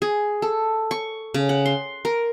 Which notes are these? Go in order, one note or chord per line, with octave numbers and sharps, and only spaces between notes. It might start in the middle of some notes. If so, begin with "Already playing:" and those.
G#4
A4
C#6
C#3
F#5
C6
A#4